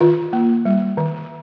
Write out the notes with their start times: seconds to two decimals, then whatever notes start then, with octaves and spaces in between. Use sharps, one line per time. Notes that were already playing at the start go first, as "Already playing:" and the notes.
0.01 D#3 F4
0.33 A#3
0.65 G3
0.97 D#3